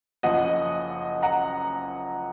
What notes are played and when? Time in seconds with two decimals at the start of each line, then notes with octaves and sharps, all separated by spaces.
0.23 F#1 F#2 F3 D#5 F#5
1.23 F#5 A#5